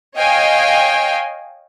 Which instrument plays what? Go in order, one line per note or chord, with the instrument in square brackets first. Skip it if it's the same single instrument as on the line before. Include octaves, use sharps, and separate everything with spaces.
[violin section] C#5 D#5 F5 G5 G#5